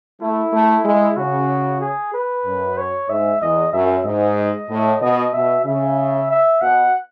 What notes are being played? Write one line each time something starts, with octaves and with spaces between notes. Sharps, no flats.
A3 E4
A3
G#3
C#3 F#4
G#4
B4
F#2
C#5
G#2 E5
E2 D#5
F#2 E5
G#2 D#5
A2
B2 D#5
B2 E5
C#3 E5
E5
B2 F#5